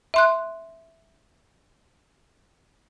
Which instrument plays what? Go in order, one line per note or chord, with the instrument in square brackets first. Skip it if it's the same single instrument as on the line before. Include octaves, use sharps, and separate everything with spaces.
[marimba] E5 C6 F#6